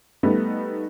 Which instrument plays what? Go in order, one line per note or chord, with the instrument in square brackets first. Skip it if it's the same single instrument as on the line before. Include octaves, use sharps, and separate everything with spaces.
[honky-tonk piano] G3 A3 B3 D#4